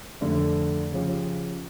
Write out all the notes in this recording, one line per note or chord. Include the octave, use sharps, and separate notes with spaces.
F2 D3 A3 D4
C#3 F3 C#4 G4